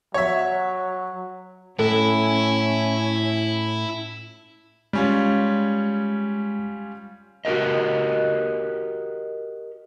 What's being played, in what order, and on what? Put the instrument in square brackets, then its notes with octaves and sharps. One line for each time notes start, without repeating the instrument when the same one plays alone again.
[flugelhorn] F#3 [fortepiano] C#5 E5
[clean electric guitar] A2 [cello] C#4 [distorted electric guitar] E4 [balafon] A4
[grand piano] G3 C#4 F4 [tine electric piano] G#3
[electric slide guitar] F#4 G4 A#4 D#5